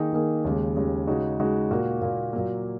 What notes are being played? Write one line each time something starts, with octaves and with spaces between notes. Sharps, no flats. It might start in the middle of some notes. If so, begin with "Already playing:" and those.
Already playing: D#3 A#3 D#4 G#4
D#3 A#3 D#4 G#4
D#2 C#3 G#3
D#2 C#3 G#3
C#3 G#3 D#4 F#4
C#3 G#3 D#4 F#4
A#2 A#3 F#4
A#2 A#3 F#4
A#2 F#3 A#3